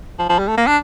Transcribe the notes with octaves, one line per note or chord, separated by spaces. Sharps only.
F3
F3
G3
A3
A#3
D4